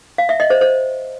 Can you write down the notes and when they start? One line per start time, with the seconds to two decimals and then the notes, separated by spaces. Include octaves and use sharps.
0.18 F5
0.29 E5
0.40 D#5
0.50 C5
0.61 C5